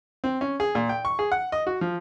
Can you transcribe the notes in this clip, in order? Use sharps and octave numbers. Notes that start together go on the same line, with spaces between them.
C4
C#4
G#4
A#2
G5
C#6
G#4
F#5
D#5
F#4
F3